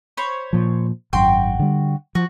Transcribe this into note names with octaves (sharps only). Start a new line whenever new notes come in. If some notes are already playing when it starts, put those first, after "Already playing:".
C5 C#5 B5
A#2 F3
G#1 F#2 F#4 G5 C6
D3 G3
F3 F#4